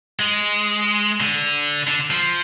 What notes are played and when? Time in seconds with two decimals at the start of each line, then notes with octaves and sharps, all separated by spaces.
0.20 G#3
1.20 D3
1.88 D3
2.10 F3